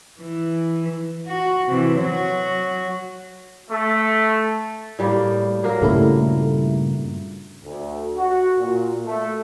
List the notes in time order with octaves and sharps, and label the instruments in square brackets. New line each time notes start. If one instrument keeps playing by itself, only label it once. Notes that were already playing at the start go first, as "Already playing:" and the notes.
[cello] E3
F#4
C3 E3
F#3 F#4
[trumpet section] A3
[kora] A2 G3 A#3
F#3 A#3 A#4
[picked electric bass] G2 A#2 C#3 [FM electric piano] G3 A3 E4
[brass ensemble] D2
F#4
A#2
A3